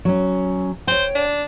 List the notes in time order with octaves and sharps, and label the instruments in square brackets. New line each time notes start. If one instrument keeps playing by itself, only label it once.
[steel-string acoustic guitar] F#3 C#4
[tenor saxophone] C5 [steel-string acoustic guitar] C#5 G5
[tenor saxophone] D4